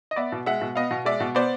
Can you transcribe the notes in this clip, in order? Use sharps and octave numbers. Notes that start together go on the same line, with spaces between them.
D#5
B3 D5 E5
B2
G#3 E5 F#5
B2
B3 D#5 F5
B2
G#3 D5 E5
B2
B3 C5 D5